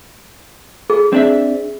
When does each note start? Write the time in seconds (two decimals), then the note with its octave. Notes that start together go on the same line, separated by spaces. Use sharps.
0.90 G#4
1.13 C4 D4 E5